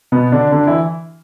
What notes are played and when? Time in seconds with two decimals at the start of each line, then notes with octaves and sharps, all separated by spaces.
0.12 B2 B3
0.32 D3 D4
0.52 D3 D4
0.67 E3 E4